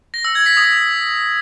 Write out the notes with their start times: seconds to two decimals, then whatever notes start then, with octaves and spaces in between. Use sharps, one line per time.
0.14 A#6
0.25 E6
0.35 G#6
0.46 B6
0.57 D#6